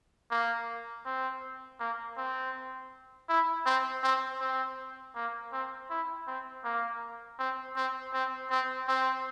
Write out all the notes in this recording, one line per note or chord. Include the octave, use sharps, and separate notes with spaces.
A#3
C4
A#3
C4
E4
C4
C4
C4
A#3
C4
E4
C4
A#3
C4
C4
C4
C4
C4